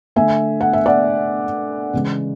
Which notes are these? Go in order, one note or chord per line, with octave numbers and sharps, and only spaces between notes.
D3 A3 E5 G#5
F#5
E5
D5 F#5
C#3 E3 G#3